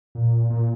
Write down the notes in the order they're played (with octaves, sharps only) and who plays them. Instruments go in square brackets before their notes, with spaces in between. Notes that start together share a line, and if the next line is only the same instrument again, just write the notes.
[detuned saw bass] A#2
A#2